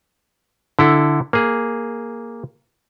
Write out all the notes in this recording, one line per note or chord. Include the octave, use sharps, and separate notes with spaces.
D3 E4 A4
A#3 G#4